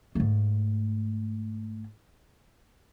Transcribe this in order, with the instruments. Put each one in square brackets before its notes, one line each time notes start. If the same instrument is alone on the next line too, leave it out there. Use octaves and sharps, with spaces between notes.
[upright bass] G#2 A3